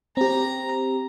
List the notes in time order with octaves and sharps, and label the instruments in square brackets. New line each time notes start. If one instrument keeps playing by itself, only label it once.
[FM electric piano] C4 G4 [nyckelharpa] A#5